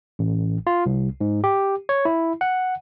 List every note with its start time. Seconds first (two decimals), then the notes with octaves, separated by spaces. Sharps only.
0.19 A1
0.67 F4
0.86 C2
1.21 G#2
1.44 G4
1.89 C#5
2.05 E4
2.41 F#5